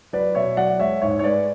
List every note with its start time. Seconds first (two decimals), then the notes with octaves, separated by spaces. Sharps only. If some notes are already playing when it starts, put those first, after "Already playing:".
0.13 F#3 B4 D5
0.35 B2 C#5 E5
0.57 F#3 D5 F#5
0.79 G#3 C#5 E5
1.02 G#2 C#5 E5
1.19 C#5
1.24 G#3 B4 D5